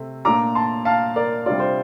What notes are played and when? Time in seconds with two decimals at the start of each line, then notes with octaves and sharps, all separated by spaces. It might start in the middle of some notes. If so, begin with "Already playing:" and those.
Already playing: C3 A3
0.25 A#2 A3 D4 F4 A#5 D6
0.55 A5 C6
0.85 F5 A5
1.16 A#4 D5
1.46 C3 G3 D4 F4 D5
1.60 C5